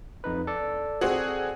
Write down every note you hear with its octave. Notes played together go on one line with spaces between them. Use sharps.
F2 D#4 B4
A4 D5
C4 F#4 G#4